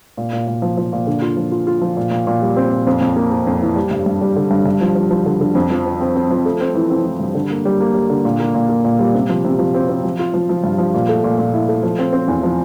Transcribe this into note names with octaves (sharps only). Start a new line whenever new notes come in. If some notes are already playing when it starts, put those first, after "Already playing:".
A#2
A#2
A#2
F3
F3
A#2
D3
F4
F3
F4
F4
F3
A#2
A#2
A#2
G3
C4
A#2
F2
F2
A#3
A#3
F2
E3
G3
G2
G2
G3
D3
G2
G2
F3
F3
F3
D3
D3
F2
F3
C4
C4
C4
F3
A3
C4
E3
C4
E3
G2
D3
A#3
G3
A#3
G3
D3
A#2
A#3
A#2
A#3
A#2
G3
C3
F3
C3
F3
C4
C4
F3
F4
F3
F3
G2
F3
A#2
A3
A#2
A#2
E4
A3
F3
C4
C4
E2
F3